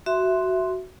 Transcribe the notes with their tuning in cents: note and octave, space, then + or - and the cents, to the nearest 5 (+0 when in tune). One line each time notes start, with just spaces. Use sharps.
F#4 +10 E5 +5 C6 +0